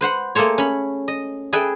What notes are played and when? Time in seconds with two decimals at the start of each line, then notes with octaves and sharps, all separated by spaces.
0.01 B4 C5 F#5 B5
0.35 A3 A#3 G#4 A4 C5 C#5
0.58 C#4 B5
1.08 D#5
1.53 G#4 A4 B4 E5 G5